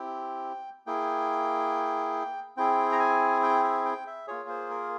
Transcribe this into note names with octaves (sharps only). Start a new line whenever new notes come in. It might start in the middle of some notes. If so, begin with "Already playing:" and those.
Already playing: C4 E4 G4 G5
A#3 E4 G#4 G5
C4 E4 G#4 G5
A#5
G#5
G5
E5
G5
E5
A#3 F4 G#4 C#5
C5
A#4